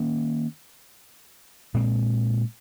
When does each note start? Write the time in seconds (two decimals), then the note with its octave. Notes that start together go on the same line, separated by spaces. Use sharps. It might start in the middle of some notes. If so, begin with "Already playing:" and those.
Already playing: D#3 A#3 C#4
1.74 A#2 G#3 C4